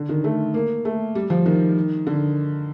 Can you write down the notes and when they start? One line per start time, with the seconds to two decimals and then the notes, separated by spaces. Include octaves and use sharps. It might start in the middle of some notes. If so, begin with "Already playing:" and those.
Already playing: D3
0.09 D#3
0.24 A3
0.54 A#3
0.85 A3
1.15 G3
1.30 F3
1.46 D#3
2.07 D3